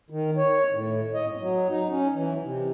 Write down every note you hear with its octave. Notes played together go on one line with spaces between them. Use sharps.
D#3
C#5
A2
D#5
G#2
F#3
D#4
C#4
E3
C3